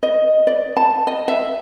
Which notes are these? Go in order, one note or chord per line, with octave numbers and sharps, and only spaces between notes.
D#5
D5
A5
D#5
E5